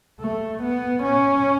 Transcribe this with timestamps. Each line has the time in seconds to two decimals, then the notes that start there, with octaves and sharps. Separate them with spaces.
0.20 A3
0.62 B3
1.03 C#4